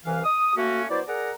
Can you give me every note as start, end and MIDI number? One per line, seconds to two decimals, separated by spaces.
0.05 0.19 36
0.05 0.19 52
0.05 0.19 77
0.24 0.56 87
0.57 0.84 57
0.57 0.84 58
0.57 0.84 61
0.57 0.84 66
0.89 1.01 54
0.89 1.01 59
0.89 1.01 64
0.89 1.01 72
0.89 1.01 74
1.07 1.31 68
1.07 1.31 70
1.07 1.31 74
1.07 1.31 78
1.07 1.31 82